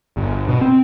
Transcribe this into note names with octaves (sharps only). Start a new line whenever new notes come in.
G1
B2
C4